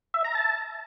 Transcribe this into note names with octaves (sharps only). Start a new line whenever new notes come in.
E5
A#5
A5